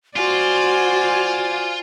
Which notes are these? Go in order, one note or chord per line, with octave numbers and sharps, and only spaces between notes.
F4 F#4 C5 D5 G#5